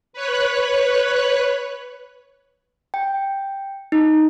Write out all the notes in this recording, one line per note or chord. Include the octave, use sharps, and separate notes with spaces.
B4 C#5 F#6
G5
D#4